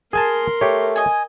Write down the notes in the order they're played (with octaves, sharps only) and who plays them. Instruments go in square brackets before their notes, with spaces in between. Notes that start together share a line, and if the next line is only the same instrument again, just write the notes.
[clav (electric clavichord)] G#4 G#5 A5 [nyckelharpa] A#4 C6
[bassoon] A3 [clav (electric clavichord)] G4 C#5
[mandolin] D#5 G#5